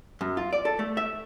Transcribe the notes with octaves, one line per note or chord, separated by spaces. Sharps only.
F#2
F4
D5
A4
A3
E5